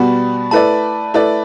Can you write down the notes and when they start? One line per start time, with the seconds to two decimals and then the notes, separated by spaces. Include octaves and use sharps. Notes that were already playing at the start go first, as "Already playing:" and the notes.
Already playing: B2 G3 B3 F#4 B5
0.51 A3 E4 B4 D5 A5
1.14 A3 E4 B4 D5